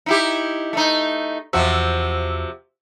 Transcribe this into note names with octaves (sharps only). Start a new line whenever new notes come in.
D#4 E4 G4
A3 D#4
E2 C3 F3 F#4 E6